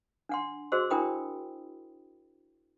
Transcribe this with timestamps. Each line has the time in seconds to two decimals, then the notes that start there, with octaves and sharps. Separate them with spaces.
0.29 D4 F#5 C6
0.72 F#4 G#4 C5 D#5 C6 E6
0.90 D4 E4 A#4 G5 B5 D#6